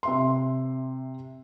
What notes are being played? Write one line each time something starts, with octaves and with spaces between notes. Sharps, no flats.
C3 E5 C6